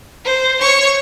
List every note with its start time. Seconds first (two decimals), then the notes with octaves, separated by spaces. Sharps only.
0.24 C5
0.60 C#5 C#6